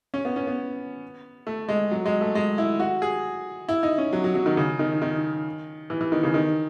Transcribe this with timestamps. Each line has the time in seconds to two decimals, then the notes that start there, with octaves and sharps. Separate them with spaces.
0.14 C#4
0.25 B3
0.36 C#4
0.47 B3
1.47 A3
1.69 G#3
1.91 F#3
2.06 G#3
2.21 A3
2.35 G#3
2.58 E4
2.80 F#4
3.02 G#4
3.69 E4
3.83 D#4
3.98 C#4
4.13 F#3
4.24 F#3
4.35 F#3
4.46 D#3
4.57 C#3
4.79 D#3
5.02 D#3
5.90 E3
6.01 E3
6.12 D#3
6.23 C#3
6.34 D#3